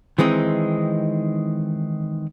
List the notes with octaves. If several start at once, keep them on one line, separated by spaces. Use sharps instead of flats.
D#3 E3 G#3 C4 D#4